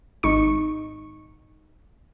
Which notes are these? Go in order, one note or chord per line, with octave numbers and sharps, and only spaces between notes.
G#1 D#4 C#6 C#7